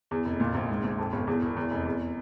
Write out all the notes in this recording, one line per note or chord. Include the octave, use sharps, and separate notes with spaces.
E2
F1
A#2
A#1
G#2
A#1
F2
G1
E2
E1
E2
F1
E2